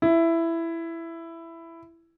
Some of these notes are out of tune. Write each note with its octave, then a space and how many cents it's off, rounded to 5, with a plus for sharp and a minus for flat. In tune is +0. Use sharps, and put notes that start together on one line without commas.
E4 +10